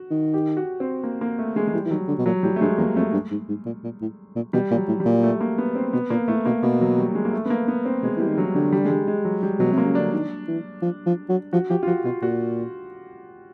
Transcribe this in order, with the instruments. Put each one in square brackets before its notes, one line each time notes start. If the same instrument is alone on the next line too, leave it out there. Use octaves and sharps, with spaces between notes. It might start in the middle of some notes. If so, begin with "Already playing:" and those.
Already playing: [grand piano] F#4
[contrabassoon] D#3
[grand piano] G4
F#4
C4
A#3
A#3
A3
G#3
G#3
[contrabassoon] E3 [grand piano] G3
[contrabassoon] E3
[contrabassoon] D#3 [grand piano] F#3
[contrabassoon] D3
B2
[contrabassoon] A#2 [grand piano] F#3
[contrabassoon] A2 [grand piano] G3
[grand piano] A3
[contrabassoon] G2 [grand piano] G#3
[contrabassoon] E2 [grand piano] A#3
[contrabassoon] F2 [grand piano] A3
[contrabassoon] G2
G#2
G#2
A#2
A#2
A2
A#2
[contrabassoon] B2 [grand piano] G3
[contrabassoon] A#2
[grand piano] F#3
[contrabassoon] A2
[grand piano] G3
[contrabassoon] A#2
[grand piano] A3
A#3
B3
C4
[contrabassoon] B2 [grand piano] B3
[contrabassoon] A#2 [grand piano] A#3
[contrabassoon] A2 [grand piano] A3
[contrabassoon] B2 [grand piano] A#3
[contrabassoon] B2 [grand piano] A#3
[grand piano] F#3
G3
G#3
A#3
A3
B3
A#3
B3
C4
[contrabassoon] B2 [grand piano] G#3
[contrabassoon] E3 [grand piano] G3
[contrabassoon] D#3
[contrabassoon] D3 [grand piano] F#3
[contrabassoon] D3 [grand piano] G3
[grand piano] G3
G#3
G3
G#3
F#3
G3
[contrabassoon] B2 [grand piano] F#3
[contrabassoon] C3
[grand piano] A#3
[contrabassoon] C#3
[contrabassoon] D3 [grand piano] D4
[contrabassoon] D#3
E3
F3
F3
F#3
[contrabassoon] F3 [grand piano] F#4
[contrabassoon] F3 [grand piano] G4
[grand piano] F4
[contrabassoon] F3 [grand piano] F#4
[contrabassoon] B2 [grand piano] F4
[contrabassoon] A#2 [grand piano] F#4